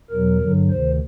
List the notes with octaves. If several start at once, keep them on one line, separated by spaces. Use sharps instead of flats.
E2 B2 F#3 A#4
G2 D3 F#3
D2 C3 D#3 C5